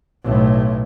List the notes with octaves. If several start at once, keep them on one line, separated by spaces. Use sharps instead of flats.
B1 A2